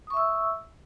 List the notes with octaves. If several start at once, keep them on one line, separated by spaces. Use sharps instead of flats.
E5 C#6 D#6 E6